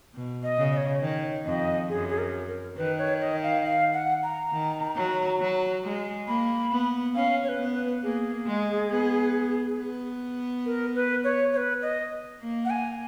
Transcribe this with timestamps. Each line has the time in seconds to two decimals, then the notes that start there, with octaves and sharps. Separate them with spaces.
0.14 B2
0.43 D#5
0.58 C#3
0.72 D#5
0.77 C#5
1.01 D#3 C#5
1.45 F2 D#5
1.89 F#2 G#4
2.09 G#4
2.18 A#4
2.48 A#4
2.77 D#3 B4
2.98 C#5
3.21 D#5
3.43 F5
3.64 F5
3.93 F#5
4.23 A#5
4.52 D#3
4.96 F#3
5.40 F#3
5.83 G#3
6.28 A#3 B5
6.71 B3
7.15 C#4 F5
7.44 C#5
7.49 B4
7.58 B3
7.73 B4
8.03 A#3 G#4
8.46 G#3
8.90 B3
9.78 B3
10.66 A#4
10.95 B4
11.24 C#5
11.53 C#5
11.57 B4
11.82 D#5
12.41 A#3
12.65 F#5
12.70 G#5